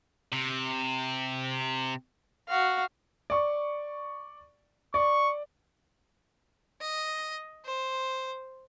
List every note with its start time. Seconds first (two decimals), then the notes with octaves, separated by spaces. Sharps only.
0.32 C3
2.48 F#4 F5
3.30 D5 C#6
4.94 D5 C#6
6.81 D#5
7.65 C5